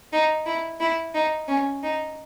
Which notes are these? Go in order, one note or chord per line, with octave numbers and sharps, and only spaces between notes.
D#4
E4
E4
D#4
C#4
D#4